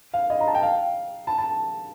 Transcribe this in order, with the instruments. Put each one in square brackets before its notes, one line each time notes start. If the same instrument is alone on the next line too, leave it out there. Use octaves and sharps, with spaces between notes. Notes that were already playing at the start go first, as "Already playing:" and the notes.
[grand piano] F5
D#5
A#5
A5
G5
F5
A5
A5